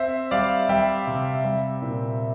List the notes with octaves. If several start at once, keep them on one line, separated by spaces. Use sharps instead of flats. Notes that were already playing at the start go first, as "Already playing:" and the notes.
Already playing: C4 C5 E5
G3 D5 F5
G3 E5 G5
C3
G3
A#2